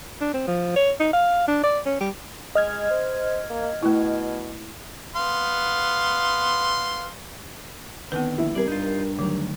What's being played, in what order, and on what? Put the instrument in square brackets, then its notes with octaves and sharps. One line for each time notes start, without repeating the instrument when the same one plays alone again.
[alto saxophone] D4
C4
F3
C#5
D#4
F5
D4
D5
C#4
G3
[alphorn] G#3 [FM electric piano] D#5 F6 G#6
[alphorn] C5
A#3
[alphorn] B2 [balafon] A3 E4
[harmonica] B3 F5 C6
[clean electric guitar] D3 D#3 [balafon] B3 C4 B4
[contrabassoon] A#1 [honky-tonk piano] E4
[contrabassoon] C3 [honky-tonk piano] G3 A#4 [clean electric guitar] G#4 D5
[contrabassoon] G2 [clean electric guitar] D#4 F4
[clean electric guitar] D2 D#3 [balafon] F#3